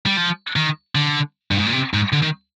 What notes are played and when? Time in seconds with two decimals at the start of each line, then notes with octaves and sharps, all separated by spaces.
0.06 G3
0.17 F3
0.56 D#3
0.95 D3
1.51 G2
1.59 G#2
1.66 A#2
1.73 C3
1.94 G#2
2.12 D3
2.22 D#3